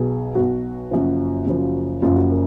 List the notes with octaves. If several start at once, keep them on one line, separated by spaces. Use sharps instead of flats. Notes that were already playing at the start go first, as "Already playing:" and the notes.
Already playing: B1 B2 F#3 G#4
B1 B2 F#3 F#4
F#1 F#2 C#3 F3
F#1 F#2 C#3 F3
F#1 F#2 C#3 F3 F4
F#4
A#4